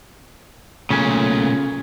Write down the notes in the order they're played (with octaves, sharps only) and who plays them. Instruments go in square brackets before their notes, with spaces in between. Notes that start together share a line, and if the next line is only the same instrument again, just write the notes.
[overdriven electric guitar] B1 A#2 [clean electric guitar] C#3 C#4 [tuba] A3